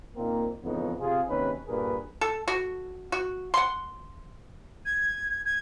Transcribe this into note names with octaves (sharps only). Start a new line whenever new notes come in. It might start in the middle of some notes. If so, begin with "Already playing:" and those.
A#2 A#3 C4 D#4 A#4
F2 G#2 C#3 E3 B3 D#4
C3 F4 G#4
G#1 D#2 C3 C#4 D#4 B4
G2 A#2 G#4 A#4 B4
A4
F#4
F#4
F#5 C6
G#6
G#6